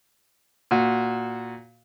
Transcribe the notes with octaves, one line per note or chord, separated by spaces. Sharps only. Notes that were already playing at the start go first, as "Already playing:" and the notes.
A#2 F#4